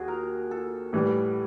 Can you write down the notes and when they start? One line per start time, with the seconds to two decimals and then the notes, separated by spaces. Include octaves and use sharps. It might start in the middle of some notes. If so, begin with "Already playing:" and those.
Already playing: D#2 F#4 G#4
0.08 A#4
0.51 A4
0.93 A2 E3 G3